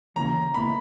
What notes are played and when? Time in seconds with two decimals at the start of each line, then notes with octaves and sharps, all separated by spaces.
0.16 D#2 C#3 E3 A#3 C#4 A#5
0.54 C#2 B2 A#3 E4 B5